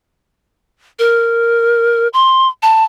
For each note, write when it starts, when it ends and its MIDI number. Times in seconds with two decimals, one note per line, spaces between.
0.99 2.08 70
2.13 2.48 84
2.63 2.84 81